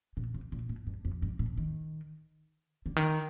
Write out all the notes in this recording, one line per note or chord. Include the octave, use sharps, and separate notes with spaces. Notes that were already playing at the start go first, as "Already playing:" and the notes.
A#2
C3
A#2
A2
G2
F2
G2
A2
D#3
D3
D#3